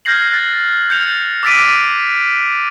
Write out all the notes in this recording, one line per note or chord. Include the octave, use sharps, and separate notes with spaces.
F6 G6 G#6 A#6 C7 F#7
F#6 A6
F6 G6 A6 C#7 F7
D6 E6 A6 B6 D7 D#7